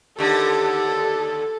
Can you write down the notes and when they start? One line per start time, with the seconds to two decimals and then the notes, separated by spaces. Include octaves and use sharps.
0.19 D#2 D3 G4 A4